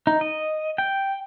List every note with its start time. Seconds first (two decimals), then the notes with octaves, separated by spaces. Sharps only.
0.07 D#4
0.21 D#5
0.78 G5